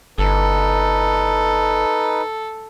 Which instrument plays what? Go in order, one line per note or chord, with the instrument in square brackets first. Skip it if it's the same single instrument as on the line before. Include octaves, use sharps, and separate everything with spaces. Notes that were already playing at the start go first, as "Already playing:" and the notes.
[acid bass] G1 [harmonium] D#4 B4 [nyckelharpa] A4